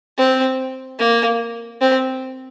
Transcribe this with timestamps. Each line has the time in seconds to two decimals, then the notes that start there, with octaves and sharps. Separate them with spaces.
0.18 C4
0.99 A#3
1.81 C4